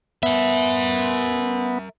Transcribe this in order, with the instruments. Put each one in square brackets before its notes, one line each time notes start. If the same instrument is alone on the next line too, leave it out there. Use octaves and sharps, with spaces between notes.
[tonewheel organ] B3 [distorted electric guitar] A#4 E5